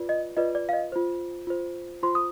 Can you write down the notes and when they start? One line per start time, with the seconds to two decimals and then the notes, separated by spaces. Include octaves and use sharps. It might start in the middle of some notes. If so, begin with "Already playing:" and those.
Already playing: F4 B4 D5
0.09 D#5
0.37 F4 B4 D5 D#5
0.55 D5
0.69 F5
0.73 D#5
0.92 F4 C5
1.47 F4 C5
2.03 F4 C5 C6
2.15 D#6